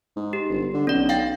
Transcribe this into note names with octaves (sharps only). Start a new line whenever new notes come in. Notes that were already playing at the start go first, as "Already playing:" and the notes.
G#2
G4
G1
D3
B1 C#4 D5
F5 G5 A6